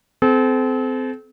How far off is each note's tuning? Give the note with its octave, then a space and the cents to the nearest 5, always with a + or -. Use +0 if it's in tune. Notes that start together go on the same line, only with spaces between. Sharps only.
C4 -25 A4 -40